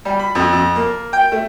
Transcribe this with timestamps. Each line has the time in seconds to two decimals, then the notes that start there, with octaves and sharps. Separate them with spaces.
0.05 G3
0.19 B5
0.35 F2
0.52 F2
0.76 A#3
1.13 G5
1.32 A3